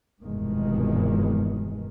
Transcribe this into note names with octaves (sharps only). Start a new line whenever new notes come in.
F1 E2 G2 B2 D#3 G#3